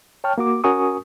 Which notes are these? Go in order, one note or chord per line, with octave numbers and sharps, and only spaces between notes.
C#5 G5 A5 C#6 F6
A#3 F#4 D6
C#4 F#4 A#4 G#5 C#6 D#6